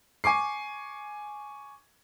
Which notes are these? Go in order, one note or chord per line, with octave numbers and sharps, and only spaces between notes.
G#5 C#6 D6 C7